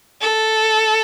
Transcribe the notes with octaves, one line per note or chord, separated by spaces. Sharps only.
A4